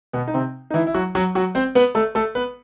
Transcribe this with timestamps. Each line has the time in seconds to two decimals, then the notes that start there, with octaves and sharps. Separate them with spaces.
0.13 B2 B3
0.28 D#4
0.34 C3 C4
0.70 D#4
0.74 E3 E4
0.87 E4
0.94 F#3 F#4
1.15 F#3 F#4
1.35 F#3 F#4
1.55 C4 C5
1.75 B3 B4
1.95 A3 A4
2.15 A3 A4
2.35 B3 B4